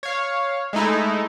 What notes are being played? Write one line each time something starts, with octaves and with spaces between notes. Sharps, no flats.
C#5 F5
G#3 A3 D#4 E4